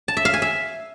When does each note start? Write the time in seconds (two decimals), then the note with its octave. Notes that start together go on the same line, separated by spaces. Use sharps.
0.08 A5
0.17 E5
0.25 F5
0.33 G#5
0.42 E5